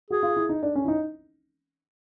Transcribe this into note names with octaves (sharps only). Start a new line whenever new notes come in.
F#4 G#4
F4
E4
D#4
D4
C#4
E4
D#4